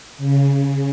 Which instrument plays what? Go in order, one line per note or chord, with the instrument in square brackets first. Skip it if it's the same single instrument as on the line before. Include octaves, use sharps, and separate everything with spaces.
[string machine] C#3